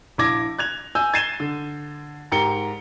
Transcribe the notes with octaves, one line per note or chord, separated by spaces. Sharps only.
A#1 E4 D6 G#6 A#6
F#6 G#6 F7
G#5 E6 G6
G#6 A6 C7 D#7 E7 G7
D3
G#2 G4 A#4 C#7 G7